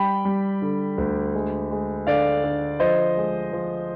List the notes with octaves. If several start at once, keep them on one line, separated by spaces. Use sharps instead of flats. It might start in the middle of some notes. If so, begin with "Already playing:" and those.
Already playing: G3 G5 B5
G3
D3
D2
G#3
G#3
D3 D5 F5
D3
F3 C5 D#5
G#3
F3